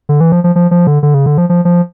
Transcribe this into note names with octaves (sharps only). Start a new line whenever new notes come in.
D3
E3
F3
F3
F3
F3
D3
D3
C#3
D3
F3
F3
F3